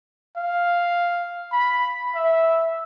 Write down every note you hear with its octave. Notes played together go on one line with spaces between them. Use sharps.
F5
B5
E5